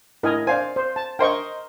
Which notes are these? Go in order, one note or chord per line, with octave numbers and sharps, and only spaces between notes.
A2 A#4 D#5 G#5
C5 D5 F5 G#5
C5
A5
A#4 C5 D#5 G5 C#6